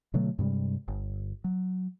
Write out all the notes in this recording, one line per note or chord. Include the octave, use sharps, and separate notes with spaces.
B2 D3 F#3 A3
G2 C3 G3 G#3
G1
F#3